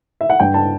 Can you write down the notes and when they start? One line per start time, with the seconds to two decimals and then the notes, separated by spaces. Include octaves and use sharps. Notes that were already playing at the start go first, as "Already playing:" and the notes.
0.21 E5
0.30 F#5
0.40 G2 G5
0.54 A5